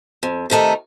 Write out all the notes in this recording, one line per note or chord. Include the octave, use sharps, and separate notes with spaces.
F2
C3 D#3 A3 D#4